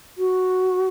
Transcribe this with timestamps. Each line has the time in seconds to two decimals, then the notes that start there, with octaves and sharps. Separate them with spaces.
0.17 F#4